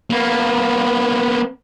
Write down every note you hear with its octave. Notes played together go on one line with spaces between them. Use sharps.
A#3 B3